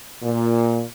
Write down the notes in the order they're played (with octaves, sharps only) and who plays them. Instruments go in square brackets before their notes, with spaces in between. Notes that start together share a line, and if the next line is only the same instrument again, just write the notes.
[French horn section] A#2